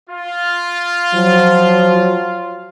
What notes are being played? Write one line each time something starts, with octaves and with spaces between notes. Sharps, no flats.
F4
F3 F#3